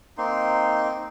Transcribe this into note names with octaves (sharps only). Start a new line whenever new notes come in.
A#3 C4 D#4 C6